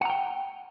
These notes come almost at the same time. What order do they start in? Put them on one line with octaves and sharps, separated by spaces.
F#5 A#5 G5